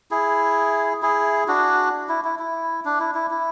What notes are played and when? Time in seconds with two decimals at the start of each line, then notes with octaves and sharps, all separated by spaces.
0.11 E4 G#4
1.02 E4 G#4
1.48 D4 F#4
2.09 E4
2.24 E4
2.39 E4
2.85 D4
3.00 E4
3.15 E4
3.30 E4